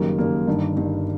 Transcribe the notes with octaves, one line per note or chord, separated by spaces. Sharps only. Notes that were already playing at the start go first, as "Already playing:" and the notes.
Already playing: F#1 F#2 D#3 G3 A#3
F#1 F#2 D#3 G3 A#3
G1 G2 D#3
G1 G2 D#3